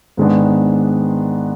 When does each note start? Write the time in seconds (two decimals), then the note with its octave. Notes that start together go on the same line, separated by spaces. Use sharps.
0.17 G#2 D#3 G#3 B3 D4